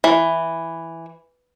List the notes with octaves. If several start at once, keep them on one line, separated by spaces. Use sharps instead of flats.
E3